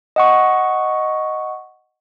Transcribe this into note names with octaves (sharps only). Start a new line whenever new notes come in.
D#5 F#5 C#6